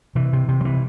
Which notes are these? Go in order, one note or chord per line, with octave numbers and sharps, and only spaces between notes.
C3 E3
C3
C3
F#3
E3